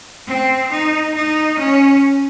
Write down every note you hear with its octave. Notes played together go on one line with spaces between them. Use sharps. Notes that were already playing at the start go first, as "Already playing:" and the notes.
C4
D#4
D#4
C#4